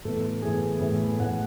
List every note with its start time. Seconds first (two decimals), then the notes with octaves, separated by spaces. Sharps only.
0.05 A2 E3 B3 A4
0.42 A2 E3 B3 G#4
0.80 A2 E3 B3
1.19 A2 E3 B3 F#5